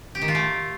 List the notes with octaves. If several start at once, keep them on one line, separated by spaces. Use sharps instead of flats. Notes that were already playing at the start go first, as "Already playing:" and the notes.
G4
D#3
F4
A3